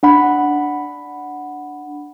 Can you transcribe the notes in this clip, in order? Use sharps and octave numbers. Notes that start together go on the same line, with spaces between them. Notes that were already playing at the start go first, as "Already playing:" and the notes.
D4 F#5 B5